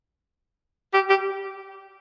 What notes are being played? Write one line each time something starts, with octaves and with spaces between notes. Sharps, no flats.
G4
G4